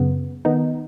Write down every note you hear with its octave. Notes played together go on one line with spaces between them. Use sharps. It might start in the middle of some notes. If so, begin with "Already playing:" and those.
Already playing: F#2 C#3 B3
D#3 B3 D#4